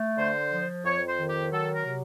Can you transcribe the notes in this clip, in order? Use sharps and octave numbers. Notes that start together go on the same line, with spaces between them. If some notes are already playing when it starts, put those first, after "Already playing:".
Already playing: A3
D3 C5
F3
F2 C#5
C5
D#3
G4
F#3 A4
A#4
C3